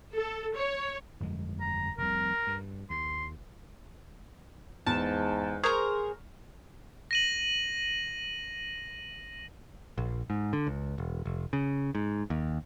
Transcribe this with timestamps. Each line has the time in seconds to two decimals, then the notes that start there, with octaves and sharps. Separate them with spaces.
0.16 A4
0.55 C#5
1.20 G1 F2 G#3
1.61 A#5
1.98 F1 C2 A#4
2.47 G2
2.90 D#2 C6
4.86 E2 G#2 A5
5.64 G#4 A#4 C5 A#5 C#6
7.11 A#6 D#7 F#7
9.98 A#1
10.30 G#2
10.53 D3
10.67 C#2
10.98 E1
11.25 F1
11.53 C#3
11.95 G#2
12.30 D#2